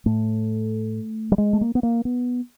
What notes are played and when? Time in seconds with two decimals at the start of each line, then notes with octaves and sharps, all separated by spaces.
0.06 A2 A3
1.32 G3
1.38 G#3
1.53 A3
1.61 A#3
1.75 B3
1.83 A#3
2.05 B3